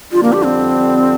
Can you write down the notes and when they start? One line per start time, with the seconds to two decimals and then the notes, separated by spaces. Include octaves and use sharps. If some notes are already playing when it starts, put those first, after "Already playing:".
0.12 F2 D3 G3 D4 F4
0.23 A#3
0.33 G4
0.43 C4